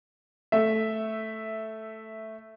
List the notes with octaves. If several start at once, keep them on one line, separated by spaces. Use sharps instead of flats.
A3 E5